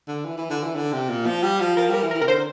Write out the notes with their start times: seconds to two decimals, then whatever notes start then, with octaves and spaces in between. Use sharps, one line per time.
0.08 D3
0.25 E3
0.38 E3
0.50 D3
0.63 E3
0.76 D3
0.93 C3
1.10 A#2
1.26 F3
1.43 G3
1.61 F3
1.77 F3 A#4
1.90 G3 A#4
2.03 E3
2.11 A#4
2.15 E3
2.21 C3 A#4
2.28 D3 C5